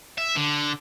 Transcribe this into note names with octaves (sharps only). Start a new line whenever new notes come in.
E5
D3